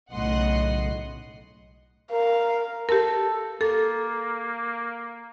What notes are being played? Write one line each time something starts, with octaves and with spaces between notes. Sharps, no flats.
B1 A2 C#3 D#5 F#5 C6
A#4 F5
G4 A4 A#4
A#3 A4